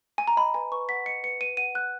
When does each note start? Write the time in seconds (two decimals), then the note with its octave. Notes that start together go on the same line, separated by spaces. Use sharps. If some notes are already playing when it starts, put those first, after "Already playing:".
0.18 G#5
0.28 A#5
0.37 D#5 B5
0.54 B4 G#5
0.72 B4 C#6
0.89 F#5 B6
1.06 D#5 C#7
1.23 B4 C#7
1.40 B4 D#7
1.57 F#5 D#7
1.74 F#5 F#6